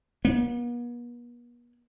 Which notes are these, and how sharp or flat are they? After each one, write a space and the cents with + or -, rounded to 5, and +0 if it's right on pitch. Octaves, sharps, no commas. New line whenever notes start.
B3 -45